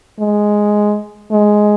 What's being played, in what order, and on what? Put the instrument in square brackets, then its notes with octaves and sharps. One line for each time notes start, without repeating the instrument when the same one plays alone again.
[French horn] G#3
G#3